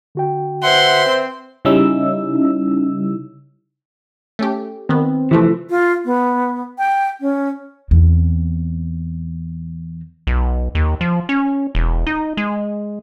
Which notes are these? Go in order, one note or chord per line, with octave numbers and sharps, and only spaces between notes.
D3 F#4 G5
B4 C5 E5 F#5 C6
C4
C#3 G3 C#4 D#4 E4 E6
A3 C#4 G4
D#3 B3 C4
C3 E3 F3 A3
F4
B3
G5
C#4
E2 C4
B1
D#2
F3
C#4
E1
D#4
G#3